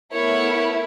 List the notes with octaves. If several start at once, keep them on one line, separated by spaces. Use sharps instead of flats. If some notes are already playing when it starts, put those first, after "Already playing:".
A3 B3 E4 A#4 C#5